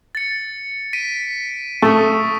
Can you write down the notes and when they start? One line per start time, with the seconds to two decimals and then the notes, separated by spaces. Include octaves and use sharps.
0.15 A6 C#7
0.93 B6 D7 D#7
1.82 A3 C#6 D#6